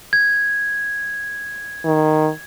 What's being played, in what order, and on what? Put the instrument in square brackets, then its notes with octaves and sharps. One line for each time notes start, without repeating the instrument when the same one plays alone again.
[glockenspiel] G#6
[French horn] D#3